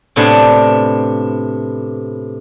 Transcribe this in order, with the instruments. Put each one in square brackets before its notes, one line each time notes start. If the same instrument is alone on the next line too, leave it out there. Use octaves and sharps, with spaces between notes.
[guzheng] A2 C3 B3 D4 C5 G#5